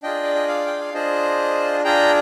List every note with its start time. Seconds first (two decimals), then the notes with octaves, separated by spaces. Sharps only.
0.03 D4 F4 G#4 D#5 G5
0.23 D5
0.35 D#5
0.48 D5 F5
0.67 G5
0.80 F5
0.94 D4 F4 G#4 C5 D#5
1.84 D4 F4 G#4 G5 A#5